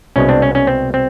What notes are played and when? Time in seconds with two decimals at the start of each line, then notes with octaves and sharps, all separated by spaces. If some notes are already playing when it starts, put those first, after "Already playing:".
0.16 C2 B2 G#3 C#4
0.29 C4 D4
0.42 C#4
0.55 C#4
0.67 C4
0.94 C4